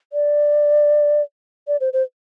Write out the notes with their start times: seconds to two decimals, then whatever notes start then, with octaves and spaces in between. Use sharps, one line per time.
0.13 D5
1.68 D5
1.81 C5
1.93 C5